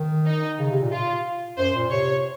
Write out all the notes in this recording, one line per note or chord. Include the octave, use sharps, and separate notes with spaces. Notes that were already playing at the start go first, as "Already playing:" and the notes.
Already playing: D#3
D#4
C#3
C3
A#2
F4
F#2 C5
A#2
C3 C#5